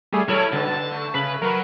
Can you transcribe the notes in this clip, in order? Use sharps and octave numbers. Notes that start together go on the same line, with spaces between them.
G3 A3 G#4
F#3 E4 A4 C#5 F6
G2 B2 D3 A5
A3
C#3 B4
F#3 A#4 B4